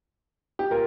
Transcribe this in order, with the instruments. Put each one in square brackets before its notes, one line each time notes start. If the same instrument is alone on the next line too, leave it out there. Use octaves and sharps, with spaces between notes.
[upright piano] G4
[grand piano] A#2 A#3 F4 [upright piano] A#4